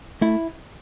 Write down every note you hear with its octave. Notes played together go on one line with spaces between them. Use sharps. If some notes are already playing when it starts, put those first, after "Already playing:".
A3 E4